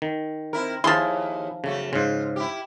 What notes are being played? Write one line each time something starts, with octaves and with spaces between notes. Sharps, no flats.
D#3
C4 E4 A#4
D#2 F3 E4 G#4 C6
F#2 C#3 A3 F#4
G#2 C#3 F4
E4 G4